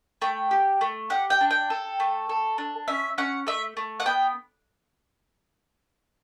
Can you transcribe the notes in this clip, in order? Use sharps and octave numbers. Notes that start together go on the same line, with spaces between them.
A3 G5
G4
A3
G4 F#5
G5
D4
G5
A4
A3
A4
D4
C#4 E5
C#4 F#5
A3 E5
A3
F#5
B3 G5